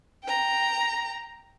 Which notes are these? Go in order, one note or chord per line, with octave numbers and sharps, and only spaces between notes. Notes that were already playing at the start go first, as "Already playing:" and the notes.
G5 A#5